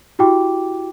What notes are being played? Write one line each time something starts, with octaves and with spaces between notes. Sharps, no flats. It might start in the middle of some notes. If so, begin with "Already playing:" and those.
E4 F#4 G4 G5 D6